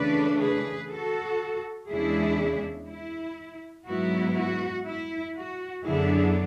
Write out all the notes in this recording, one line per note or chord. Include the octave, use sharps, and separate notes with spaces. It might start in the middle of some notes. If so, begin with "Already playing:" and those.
Already playing: C#3 E3 A3 D4 B4 D5
G#4 B4
F#4 A4
E2 C#3 G#3 D4 E4 G#4
E4
G#2 F#3 B3 E4 F#4
F#4
E4
F#4
F#2 D3 F#3 B3 D4 E4 G#4